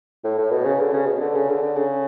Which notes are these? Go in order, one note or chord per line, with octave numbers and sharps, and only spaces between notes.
A2
A2
B2
C#3
D3
C#3
B2
D3
C#3
D3
D3
C#3